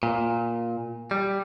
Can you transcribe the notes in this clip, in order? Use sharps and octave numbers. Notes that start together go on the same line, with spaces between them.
A#2
G3